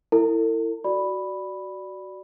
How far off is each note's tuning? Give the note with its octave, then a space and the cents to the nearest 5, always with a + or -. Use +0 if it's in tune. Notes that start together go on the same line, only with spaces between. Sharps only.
E4 +5 A4 +45
F#4 +10 D5 +0 B5 +0